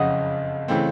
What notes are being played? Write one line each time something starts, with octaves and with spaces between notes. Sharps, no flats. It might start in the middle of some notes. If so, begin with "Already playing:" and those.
Already playing: F#1 F2 C#3 D#5 F#5
C#3 E3 A3 C4